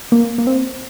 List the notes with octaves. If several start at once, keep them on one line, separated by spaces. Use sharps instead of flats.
A#3
A#3
C4